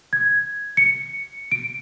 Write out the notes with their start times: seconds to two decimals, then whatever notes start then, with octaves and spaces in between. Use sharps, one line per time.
0.13 G#6
0.77 C#7
1.52 D7